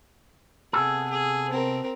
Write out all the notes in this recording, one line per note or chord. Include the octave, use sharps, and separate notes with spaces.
C3 B3 G#4 A4
G#4
C4 A#4